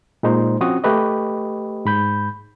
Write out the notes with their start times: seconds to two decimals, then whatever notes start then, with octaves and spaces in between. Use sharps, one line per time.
0.23 A#2 G#3 D#4 C5
0.61 F3 C4 C#4 F#4 D#6
0.84 A3 G4 B4 D#5
1.85 G#2 B5 G6